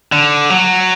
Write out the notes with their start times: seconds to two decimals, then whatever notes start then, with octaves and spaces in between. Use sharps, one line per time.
0.12 D3
0.50 F#3